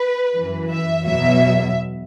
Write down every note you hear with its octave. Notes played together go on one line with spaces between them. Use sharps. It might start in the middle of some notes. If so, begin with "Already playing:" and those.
Already playing: B4
F#2 E3
E5
E2 B2 F#3 E5